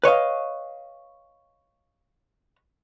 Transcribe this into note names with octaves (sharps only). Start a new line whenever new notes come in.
B4 C#5 D#5 F5